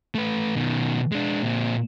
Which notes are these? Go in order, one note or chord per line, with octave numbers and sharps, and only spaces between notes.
A3 B4
B2 D#3
G#3 D4
A#2 C4